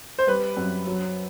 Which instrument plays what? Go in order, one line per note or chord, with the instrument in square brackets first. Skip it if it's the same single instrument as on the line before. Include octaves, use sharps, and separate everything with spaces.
[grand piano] C5
[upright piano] G3 [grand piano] B4
[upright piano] F#2
F#3